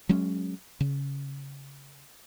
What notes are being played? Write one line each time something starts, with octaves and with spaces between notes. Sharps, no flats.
F#3 G#3 C#4
C#3